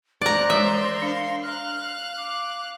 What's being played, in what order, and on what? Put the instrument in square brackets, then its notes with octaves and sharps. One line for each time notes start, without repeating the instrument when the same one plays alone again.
[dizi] C5 [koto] D5 A#5 [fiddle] F#6
[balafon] E3 G#3 [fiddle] A#4 C6 [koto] E5
[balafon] D4 [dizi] F5
[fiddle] F5 F#6 [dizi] F6
[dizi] D6